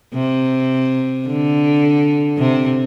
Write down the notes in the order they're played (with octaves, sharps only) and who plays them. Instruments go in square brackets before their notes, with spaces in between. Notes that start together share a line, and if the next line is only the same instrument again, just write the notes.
[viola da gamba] C3
D3
C3